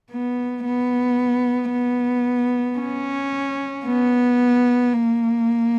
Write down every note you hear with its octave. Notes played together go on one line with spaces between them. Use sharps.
B3
B3
B3
C#4
B3
A#3